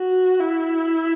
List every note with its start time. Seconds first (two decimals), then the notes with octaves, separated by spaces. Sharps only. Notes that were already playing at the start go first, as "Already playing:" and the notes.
Already playing: F#4
0.40 E4